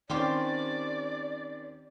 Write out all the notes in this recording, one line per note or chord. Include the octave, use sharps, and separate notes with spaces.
D#3 C4 C#4 F4 G4 C5 D5